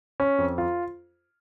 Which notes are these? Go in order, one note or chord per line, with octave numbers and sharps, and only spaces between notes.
C#4
F2
F4